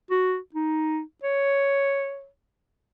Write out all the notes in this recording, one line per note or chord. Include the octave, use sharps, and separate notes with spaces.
F#4
D#4
C#5